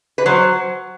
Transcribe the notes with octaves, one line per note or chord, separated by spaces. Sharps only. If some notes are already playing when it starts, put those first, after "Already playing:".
B4
F#3 C5